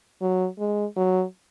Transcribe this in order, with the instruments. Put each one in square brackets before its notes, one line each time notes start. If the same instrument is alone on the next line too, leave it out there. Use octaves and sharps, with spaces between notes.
[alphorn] F#3
G#3
F#3